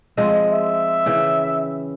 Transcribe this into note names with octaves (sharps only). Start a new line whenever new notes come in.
F3 G#3 C4
E5
C#3 E3 G5